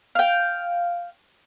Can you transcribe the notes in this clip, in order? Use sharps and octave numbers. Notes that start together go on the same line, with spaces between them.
F5 G5